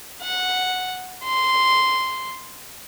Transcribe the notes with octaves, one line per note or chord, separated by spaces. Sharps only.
F#5
C6